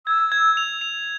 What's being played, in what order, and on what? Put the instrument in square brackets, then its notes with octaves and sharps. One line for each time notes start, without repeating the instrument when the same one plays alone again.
[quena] E6 [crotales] G#6
[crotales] G#6
F7
F7